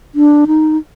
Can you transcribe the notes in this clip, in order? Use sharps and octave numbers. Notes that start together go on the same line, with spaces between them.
D4
D#4